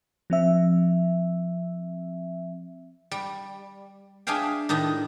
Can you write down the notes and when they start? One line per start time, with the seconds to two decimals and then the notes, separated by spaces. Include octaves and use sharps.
0.30 F3 C4 E5
3.11 G3
4.27 D4 G#4 E5 F5 G5
4.69 A2 D#3 D4 D#4